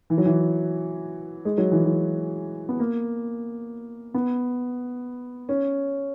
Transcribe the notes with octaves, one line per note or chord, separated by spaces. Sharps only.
E3
F#3
E3
G#3
F#3
E3
F#3
B3
A#3
B3
C#4